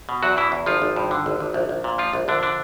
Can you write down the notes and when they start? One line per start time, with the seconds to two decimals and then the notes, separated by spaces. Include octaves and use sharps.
0.09 B2
0.23 E2 F#3 F#4
0.37 B2 E3 E4
0.52 E2
0.66 G#1 F3 F4
0.82 G#1
0.96 G2
1.11 D3
1.26 G#1
1.40 G#1
1.54 A#1
1.69 A#1
1.84 A#2
1.98 F3 F4
2.14 A#1
2.28 A#1 D3 D4
2.43 D3 D4